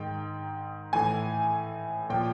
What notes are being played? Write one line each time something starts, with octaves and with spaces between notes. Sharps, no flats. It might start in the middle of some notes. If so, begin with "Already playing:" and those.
Already playing: G#2 D#3 G5
A2 E3 G#5
A#2 F3 G5